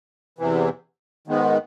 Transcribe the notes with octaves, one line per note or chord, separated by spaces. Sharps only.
E2 C3 E3
G#2 D#3 G#3 B3